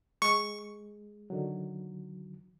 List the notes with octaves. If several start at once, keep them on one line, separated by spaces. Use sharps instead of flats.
G#3 C#6
D3 D#3 F#3